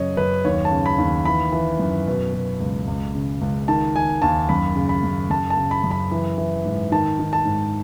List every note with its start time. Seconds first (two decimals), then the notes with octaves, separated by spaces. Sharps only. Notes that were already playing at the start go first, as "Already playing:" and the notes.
Already playing: F#2 C#3 C#5 D#5
0.17 F#2 B4
0.45 D#2 C#5
0.65 A5
0.71 C#3
0.86 B5
0.98 D#2
1.25 E3 B5
1.52 E3
1.79 F#2
2.07 B2
2.33 B2
2.60 C#2
2.87 C#2
3.15 C#3
3.41 C#2
3.68 D#3 A5
3.95 D#3 G#5
4.22 D#2 A5
4.49 F#2 B5
4.76 C#3
4.89 B5
5.04 F#2
5.30 F#2 A5
5.50 A5
5.57 C#3
5.71 B5
5.84 F#2
5.91 B5
6.11 E3
6.38 E3
6.66 G#2
6.92 D#3 A5
7.19 D#3
7.33 A5
7.45 G#2